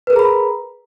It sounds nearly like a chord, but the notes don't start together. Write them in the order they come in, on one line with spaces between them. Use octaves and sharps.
B4 A#4 G#4 A#5 B5